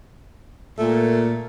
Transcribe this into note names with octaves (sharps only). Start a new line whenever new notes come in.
A#2 A3